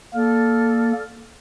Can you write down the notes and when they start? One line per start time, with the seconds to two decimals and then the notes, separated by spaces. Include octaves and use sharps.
0.14 A#3 A4 D5 F6